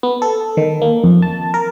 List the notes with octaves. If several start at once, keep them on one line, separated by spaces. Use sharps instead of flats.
B3
A4
D#3
A#3
F2
A5
A#4